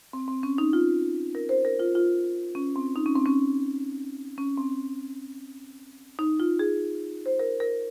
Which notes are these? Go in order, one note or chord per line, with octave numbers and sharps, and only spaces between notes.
C4
C4
C#4
D#4
F4
A#4
C5
A#4
F4
F4
C#4
C4
D#4
C#4
C4
C#4
C#4
C4
D#4
F4
G#4
C5
A#4
A#4